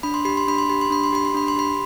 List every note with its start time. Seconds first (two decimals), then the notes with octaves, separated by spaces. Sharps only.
0.03 D4 B5
0.14 C6
0.25 G4 B5
0.37 C6
0.47 D4 B5
0.58 C6
0.70 G4 B5
0.81 C6
0.90 D4 B5
1.04 C6
1.12 G4 B5
1.25 C6
1.34 D4 B5
1.48 C6
1.56 G4 B5